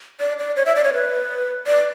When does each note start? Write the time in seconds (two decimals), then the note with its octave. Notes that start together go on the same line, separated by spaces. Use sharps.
0.20 D5
0.39 D5
0.56 C#5
0.66 E5
0.76 D5
0.84 C#5
0.93 B4
1.67 D5